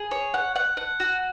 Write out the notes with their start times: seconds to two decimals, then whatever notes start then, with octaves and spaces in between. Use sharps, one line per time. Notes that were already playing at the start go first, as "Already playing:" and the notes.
Already playing: G#4
0.11 C#5
0.34 F#5
0.56 F#5
0.77 F#5
1.00 F#4